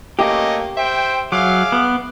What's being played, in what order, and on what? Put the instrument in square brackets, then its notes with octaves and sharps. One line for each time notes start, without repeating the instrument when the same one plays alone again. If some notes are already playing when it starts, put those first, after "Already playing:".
[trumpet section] A3 C#4 D#5 [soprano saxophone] A#3 [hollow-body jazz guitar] G4
[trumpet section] C5 G5 [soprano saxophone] E5
[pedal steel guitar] F#3 [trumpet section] G#4 E5 F5 [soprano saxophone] D6
[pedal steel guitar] B3